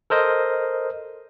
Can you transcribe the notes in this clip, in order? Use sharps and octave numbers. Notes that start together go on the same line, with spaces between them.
A4 A#4 C5 D#5